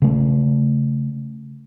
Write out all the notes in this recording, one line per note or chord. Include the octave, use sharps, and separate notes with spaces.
C#3 A3